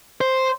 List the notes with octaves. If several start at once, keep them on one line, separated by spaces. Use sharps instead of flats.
C5